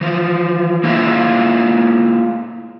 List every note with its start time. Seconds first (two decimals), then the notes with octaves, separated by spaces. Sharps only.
0.01 E3 F3
0.84 A#3 E4 F4 G#4 D#5 E5